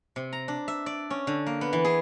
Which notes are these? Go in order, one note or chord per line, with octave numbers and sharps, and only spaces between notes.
C3
A#5
D4
E5
D5
C#4
D3
A#3
B3
E3
G#4